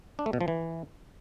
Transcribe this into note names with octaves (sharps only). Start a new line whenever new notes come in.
D4
A3
B2
F3
E3